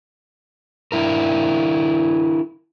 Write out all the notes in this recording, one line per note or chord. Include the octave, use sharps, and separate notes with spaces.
D4 E4 A#4